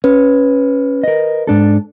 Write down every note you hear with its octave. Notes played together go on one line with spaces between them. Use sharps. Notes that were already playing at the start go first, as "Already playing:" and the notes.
C#4 B4
A#4 D#5
G#2 D4 A4